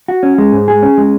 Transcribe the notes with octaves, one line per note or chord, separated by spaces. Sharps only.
F#4
C#4
G#3
G#2
G#4
C#4
G#3